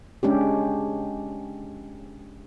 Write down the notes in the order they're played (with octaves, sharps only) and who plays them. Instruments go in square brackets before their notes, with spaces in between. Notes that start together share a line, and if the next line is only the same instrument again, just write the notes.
[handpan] G#3 C#4 D4 G4